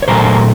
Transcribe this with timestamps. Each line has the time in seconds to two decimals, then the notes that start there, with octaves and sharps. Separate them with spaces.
0.02 C#5
0.08 A#2 F#3 A3 A#4 C5